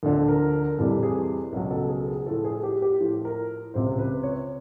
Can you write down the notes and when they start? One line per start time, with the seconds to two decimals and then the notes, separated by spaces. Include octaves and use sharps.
0.03 D2 D3 F3 A4
0.28 A#4
0.53 A#4
0.77 F2 C3 E3 G3 A4
1.03 G#4
1.52 C#2 B2 F#3
1.71 A4
1.88 G#4
2.08 G#4
2.26 A2 F3 A4
2.45 G#4
2.63 G4
2.82 G4
3.00 A2 F3
3.25 A#4
3.74 C#2 C3 F3 C5
3.98 B4
4.23 C#5